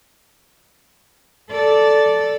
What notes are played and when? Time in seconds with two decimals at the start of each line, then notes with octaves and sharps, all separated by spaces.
1.50 A4 D5